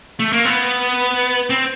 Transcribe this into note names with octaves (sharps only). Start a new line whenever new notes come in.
A3
A#3
B3
C4